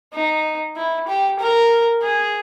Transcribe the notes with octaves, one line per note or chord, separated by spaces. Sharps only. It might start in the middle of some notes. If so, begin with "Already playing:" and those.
D#4
E4
G4
A#4
G#4